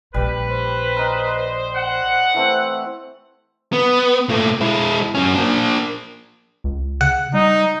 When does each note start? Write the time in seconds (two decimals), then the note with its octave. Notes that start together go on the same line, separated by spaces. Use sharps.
0.14 A#1 G3 G4 B4
0.50 C5
0.97 A#4 D#5 G5
1.75 F#5
2.34 E3 A3 C4
3.73 B3
4.29 A#2 A3
4.61 G#3 E4
5.15 F#2 C#4
5.35 A#3 D4
6.64 C#2
7.01 C#3 F#5
7.34 G3 D#4